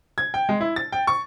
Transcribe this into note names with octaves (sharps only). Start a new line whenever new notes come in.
G#6
G5
G#3
E4
A6
G5
C#6